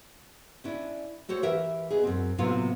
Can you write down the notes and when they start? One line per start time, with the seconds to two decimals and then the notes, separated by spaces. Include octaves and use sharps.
0.64 C#4 D4 E4
1.29 A3 F#4 C5 C#5
1.43 E3 G4 A#4 E5
1.90 B2 G#4
2.03 F#2 C4
2.38 A2 C3 F#3 A#3 B3 F4